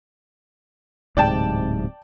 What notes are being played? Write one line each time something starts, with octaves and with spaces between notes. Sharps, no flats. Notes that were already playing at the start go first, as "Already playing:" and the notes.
D1 G#2 C3 D5 G5 A5